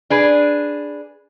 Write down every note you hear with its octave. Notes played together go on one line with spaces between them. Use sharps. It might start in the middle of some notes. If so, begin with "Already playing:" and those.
D4 G#4 B4